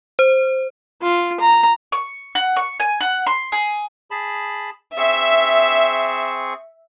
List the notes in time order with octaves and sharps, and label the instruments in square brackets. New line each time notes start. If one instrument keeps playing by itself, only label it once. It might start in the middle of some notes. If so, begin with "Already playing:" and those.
[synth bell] C5
[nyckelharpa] F4
A#5
[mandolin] C#6
F#5
C#6
G#5
F#5
C6
G#4
[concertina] G#4 A5 B5
[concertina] C4 G#4 C#6 [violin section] E5